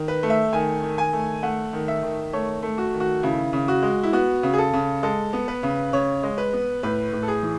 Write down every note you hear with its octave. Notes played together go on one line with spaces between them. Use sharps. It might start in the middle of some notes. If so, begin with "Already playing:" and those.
Already playing: D#3
B4
A3
E5
D#3 G#5
D#3
G#5
A3
A3 F#5
D#3
E5
D#3
A3 C#5
A3
F#4
D#3
F#4
C#3 E4
C#3
F#4
G#3
E4
B3 F#4
C#3
G#4
A4
C#3
G#3 A4
B3
B4
C#3
C#3 C#5
G#3
B4
B3
A2 B4
A2
A4
G#4
E3